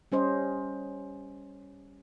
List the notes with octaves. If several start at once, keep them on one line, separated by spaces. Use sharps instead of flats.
G3 C#4 C5 D#5